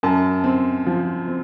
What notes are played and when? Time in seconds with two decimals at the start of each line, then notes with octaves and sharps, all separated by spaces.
0.03 F#2 A5
0.44 C4
0.86 F3
1.28 C4